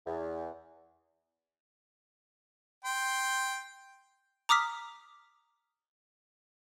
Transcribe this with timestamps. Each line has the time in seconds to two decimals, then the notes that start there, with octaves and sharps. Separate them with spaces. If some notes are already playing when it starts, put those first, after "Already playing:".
0.07 E2
2.85 G5 C6
4.49 A#5 D6 D#6 F6 B6